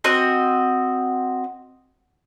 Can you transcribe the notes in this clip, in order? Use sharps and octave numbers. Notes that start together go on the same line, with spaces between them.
C4 F#4 D#5